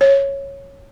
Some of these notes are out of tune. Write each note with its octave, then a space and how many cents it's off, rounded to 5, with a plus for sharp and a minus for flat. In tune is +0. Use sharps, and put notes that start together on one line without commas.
C#5 -5